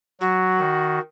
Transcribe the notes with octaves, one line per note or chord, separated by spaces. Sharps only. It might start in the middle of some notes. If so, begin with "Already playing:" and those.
F#3 F#4
D#3